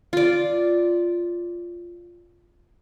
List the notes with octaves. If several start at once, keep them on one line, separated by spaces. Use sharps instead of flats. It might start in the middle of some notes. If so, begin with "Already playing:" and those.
F4 D5